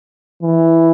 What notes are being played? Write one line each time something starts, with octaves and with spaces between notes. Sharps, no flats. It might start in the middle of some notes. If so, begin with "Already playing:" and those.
E3